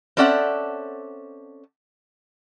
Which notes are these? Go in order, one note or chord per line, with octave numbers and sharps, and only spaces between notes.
C4 C#4 A4 D5 E5 F#5